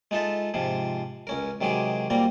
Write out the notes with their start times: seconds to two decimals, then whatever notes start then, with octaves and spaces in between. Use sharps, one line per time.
0.11 G#3 D#4 F4 A4 E5
0.54 G#2 C3 F3
1.27 C#2 C#4 A#4
1.61 C3 D#3 F#3 G#3 G#4 D6
2.10 A#2 G3 A#3 C4 A#5